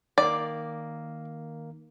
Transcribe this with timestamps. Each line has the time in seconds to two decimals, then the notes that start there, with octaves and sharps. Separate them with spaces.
0.18 D#3 A#3 D5